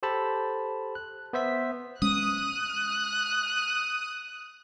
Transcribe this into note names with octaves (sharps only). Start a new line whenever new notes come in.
G4 A4 C5 A5 B5
F#6
B3 C5 E5 B6
G#3 C#4 D#6 F#6